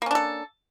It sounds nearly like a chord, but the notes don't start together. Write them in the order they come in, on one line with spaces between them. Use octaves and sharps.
A#3 C#4 D4 A4